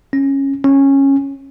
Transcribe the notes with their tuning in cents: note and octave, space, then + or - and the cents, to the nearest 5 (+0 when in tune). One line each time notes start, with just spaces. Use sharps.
C#4 -15
C#4 -15